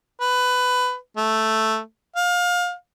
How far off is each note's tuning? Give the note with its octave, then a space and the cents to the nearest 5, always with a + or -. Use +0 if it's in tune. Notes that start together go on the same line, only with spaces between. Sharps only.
B4 +15
A3 +0
F5 +25